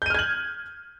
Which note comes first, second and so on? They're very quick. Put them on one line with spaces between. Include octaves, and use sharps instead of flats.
G6 D#7 F6 G#6 F#7